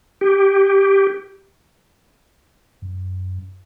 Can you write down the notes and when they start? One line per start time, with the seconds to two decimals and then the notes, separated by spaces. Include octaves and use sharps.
0.21 G4
2.82 F#2